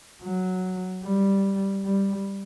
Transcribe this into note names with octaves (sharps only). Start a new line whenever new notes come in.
F#3
G3
G3